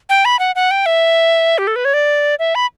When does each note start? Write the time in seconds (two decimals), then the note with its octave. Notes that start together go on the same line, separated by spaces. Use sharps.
0.09 G5
0.25 B5
0.39 F#5
0.56 F#5
0.71 G5
0.86 E5
1.58 G4
1.67 A4
1.76 B4
1.85 C#5
1.94 D5
2.39 E5
2.55 B5